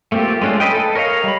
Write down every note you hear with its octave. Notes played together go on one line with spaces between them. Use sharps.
A3 A#3 C4 F4 G4
G#3 A3 C#4 D4 F4
A4 B4 D#5 G5
A4
A#4 C#5 D#5 F5
G3 B5